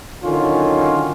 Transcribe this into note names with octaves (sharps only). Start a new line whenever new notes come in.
D3 D#3 F#3 C#4 F4